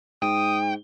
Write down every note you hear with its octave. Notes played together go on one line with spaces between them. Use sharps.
G#2 G5 D#6